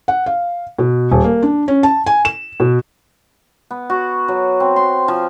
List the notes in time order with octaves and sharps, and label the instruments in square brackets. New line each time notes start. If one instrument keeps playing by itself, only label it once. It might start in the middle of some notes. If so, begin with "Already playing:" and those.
[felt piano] F#5
F5
B2
D#1
A#3
D4
C#4
A5
G#5
E7
B2
[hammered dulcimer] B3
F#4
F#3
C4
C6
F3